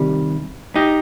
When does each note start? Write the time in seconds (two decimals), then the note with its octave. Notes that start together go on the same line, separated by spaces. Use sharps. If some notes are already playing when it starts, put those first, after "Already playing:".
Already playing: C3 D#3 G3
0.76 D#4 G4